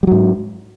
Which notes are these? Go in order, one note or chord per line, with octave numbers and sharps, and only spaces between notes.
G#2 F#3 G3